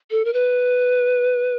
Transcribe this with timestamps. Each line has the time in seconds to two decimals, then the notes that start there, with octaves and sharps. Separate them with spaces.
0.11 A4
0.25 A#4
0.33 B4